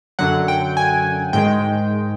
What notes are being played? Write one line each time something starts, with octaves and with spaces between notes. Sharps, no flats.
F#2 D3 F#3 F#5
G5
G#5
G#2 D#3 G#3 G5